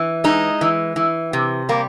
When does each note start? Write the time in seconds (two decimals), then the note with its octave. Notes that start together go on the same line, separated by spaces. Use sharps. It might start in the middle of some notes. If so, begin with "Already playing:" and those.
Already playing: E3
0.24 G#3 D#4
0.61 E3
0.96 E3
1.33 C3
1.69 G3 A#3